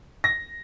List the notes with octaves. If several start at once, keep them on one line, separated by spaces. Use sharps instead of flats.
A#6